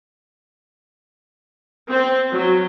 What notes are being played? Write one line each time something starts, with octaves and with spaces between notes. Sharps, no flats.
C4
F#3